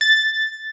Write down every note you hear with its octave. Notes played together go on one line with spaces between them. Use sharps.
A6